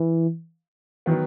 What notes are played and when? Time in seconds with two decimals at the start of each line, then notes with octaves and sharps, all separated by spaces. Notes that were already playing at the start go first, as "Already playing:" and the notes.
Already playing: E3
1.06 D#3 E3 F#3 B3